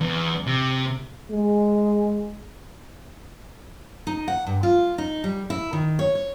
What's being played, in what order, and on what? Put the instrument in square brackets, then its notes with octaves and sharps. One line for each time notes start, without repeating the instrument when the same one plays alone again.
[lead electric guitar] E2
C3
[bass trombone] G#3
[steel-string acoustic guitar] D#4
F#5
G2
F4
D#4
G3
E4
D#3
C#5
C#5